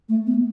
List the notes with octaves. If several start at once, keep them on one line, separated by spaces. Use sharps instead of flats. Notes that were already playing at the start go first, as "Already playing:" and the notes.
A3
B3